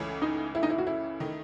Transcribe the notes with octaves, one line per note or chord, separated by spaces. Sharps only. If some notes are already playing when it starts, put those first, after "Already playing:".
Already playing: C#2 C#3 E3 A3 C#4
D#4
E4
D#4
E4
F#4
E4
D#3 A3 D#4